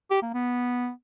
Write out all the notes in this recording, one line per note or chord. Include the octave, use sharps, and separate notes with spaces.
G4
A#3
B3